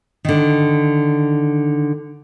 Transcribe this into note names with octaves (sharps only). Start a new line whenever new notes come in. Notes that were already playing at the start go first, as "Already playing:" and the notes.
D3 D#3